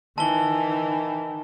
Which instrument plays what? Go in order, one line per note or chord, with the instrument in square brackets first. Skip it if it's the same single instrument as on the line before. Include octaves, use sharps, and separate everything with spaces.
[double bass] D#3 [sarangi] E3 [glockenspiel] A5 G7